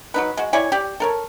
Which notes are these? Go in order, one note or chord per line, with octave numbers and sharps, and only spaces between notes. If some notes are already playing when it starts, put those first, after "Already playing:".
F#3 D#4 B4
G#3 F#4
E4 C#5 D5 G#5
G4 D5
A4 A#4 C#5